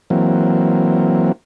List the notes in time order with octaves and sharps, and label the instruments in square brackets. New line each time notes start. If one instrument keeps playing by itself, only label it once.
[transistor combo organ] E3 F#3 A#3 C4